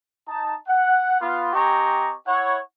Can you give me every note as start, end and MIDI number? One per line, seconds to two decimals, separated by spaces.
0.28 0.55 63
0.28 0.55 81
0.67 1.18 78
1.21 1.53 59
1.21 1.53 65
1.53 2.14 60
1.53 2.14 67
1.53 2.14 75
1.53 2.14 80
1.53 2.14 82
1.53 2.14 85
2.27 2.58 64
2.27 2.58 73
2.27 2.58 78